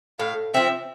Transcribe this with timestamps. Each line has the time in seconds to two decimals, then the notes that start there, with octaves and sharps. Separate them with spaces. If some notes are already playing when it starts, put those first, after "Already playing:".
0.19 A2 F5
0.54 F3 C4 E5